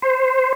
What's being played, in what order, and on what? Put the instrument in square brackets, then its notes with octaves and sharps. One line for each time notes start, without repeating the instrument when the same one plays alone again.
[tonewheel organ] C5